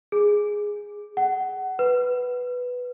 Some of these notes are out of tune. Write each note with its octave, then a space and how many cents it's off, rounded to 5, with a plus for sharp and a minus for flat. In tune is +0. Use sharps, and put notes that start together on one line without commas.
G#4 -5
F#5 +20
B4 +0